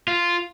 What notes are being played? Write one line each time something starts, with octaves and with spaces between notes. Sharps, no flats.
F4